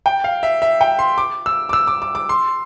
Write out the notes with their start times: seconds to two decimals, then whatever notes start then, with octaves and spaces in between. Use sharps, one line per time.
0.06 G5
0.24 F5
0.43 E5
0.62 E5
0.81 G5
0.99 C6
1.18 D6
1.46 E6
1.69 D6
1.73 E6
1.87 D6
2.02 D6
2.15 D6
2.29 C6